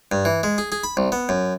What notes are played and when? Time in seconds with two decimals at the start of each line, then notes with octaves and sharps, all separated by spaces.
0.12 G2
0.25 E3
0.43 G#3
0.58 G#4
0.72 G#4
0.84 B5
0.97 C2
1.12 B3
1.29 F#2